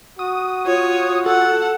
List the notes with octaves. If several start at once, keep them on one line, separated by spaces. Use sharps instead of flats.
F#4 D#6
F4 C#5
A4 F#5